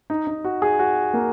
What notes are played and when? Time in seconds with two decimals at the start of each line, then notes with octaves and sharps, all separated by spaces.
0.10 D#4
0.27 D#4
0.44 F#4
0.62 G#4
0.79 F#4
1.14 A#3